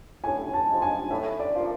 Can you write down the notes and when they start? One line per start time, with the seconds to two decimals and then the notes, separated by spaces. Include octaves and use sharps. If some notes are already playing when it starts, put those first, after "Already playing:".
0.24 A2 G#5
0.53 A5
0.67 F3 G#3
0.82 G#5
1.10 A2 E5
1.40 D5
1.54 F3 A#3